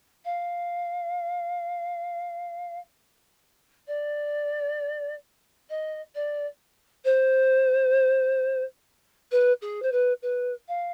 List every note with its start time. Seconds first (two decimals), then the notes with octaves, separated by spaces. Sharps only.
0.25 F5
3.87 D5
5.69 D#5
6.15 D5
7.04 C5
9.31 B4
9.61 G#4
9.82 C5
9.92 B4
10.22 B4
10.68 F5